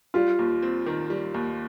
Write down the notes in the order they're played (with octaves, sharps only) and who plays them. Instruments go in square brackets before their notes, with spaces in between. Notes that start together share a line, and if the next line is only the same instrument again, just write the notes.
[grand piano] G3 [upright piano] F4
[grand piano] D#2
C4
D#3
G3
D#2